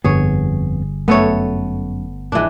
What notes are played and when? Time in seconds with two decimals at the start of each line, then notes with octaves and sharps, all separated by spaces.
0.04 G1 F2 B3 G#4 C#5
1.08 F#2 A3 B3 A4 C#5
2.32 G#2 E3 F3 G#3 D4